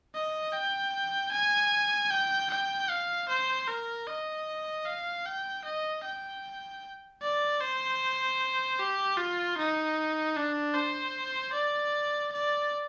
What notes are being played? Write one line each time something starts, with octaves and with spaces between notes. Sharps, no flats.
D#5
G5
G#5
G5
G5
F5
C5
A#4
D#5
F5
G5
D#5
G5
D5
C5
G4
F4
D#4
D4
C5
D5
D5